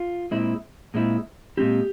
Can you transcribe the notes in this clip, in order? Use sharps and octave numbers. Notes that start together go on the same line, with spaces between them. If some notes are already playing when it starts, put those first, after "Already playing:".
Already playing: F4
A#2 G#3 C4 E4
A#2 G#3 C4 E4
A#2 G#3 C4 E4 G4